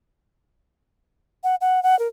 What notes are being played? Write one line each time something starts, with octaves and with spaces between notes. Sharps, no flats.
F#5
F#5
F#5
A#4